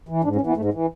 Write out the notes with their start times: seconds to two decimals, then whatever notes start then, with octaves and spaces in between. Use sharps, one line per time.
0.09 E3
0.24 G#2 D4
0.36 C#4
0.41 E3
0.47 B3
0.56 G#2 A3
0.65 G#3
0.73 E3